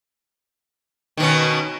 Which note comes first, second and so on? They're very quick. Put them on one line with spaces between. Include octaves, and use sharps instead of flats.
D#3 B2 C#4